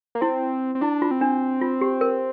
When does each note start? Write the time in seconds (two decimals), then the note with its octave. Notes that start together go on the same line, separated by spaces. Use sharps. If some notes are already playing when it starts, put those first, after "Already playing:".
0.15 A#3
0.21 C4 E4
0.75 C4
0.81 D4 E4
1.02 F4
1.11 C4
1.21 D4
1.61 F4
1.81 G4
2.01 A#4